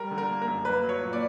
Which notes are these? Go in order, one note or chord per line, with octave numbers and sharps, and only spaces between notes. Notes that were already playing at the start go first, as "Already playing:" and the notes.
Already playing: G3 A#4
D3
A#4
A#3
A#4
F#2
A#3 B4
F#3
C#5
A#2
D5